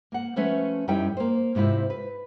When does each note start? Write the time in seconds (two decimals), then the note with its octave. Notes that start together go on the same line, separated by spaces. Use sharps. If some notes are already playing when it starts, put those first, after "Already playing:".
0.12 A#3 F#5
0.36 F3 A3 C#4 B4 E5
0.88 F#2 G3 C#4 D#4 E4 G5
1.17 A#3 C5
1.55 G#2 C3 C4 E4 F4
1.90 B4